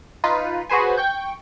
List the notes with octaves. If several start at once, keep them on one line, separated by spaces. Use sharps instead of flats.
D#4 F4 B4
F#4 G#4 B4 C5 G#5
G5 C#6 G6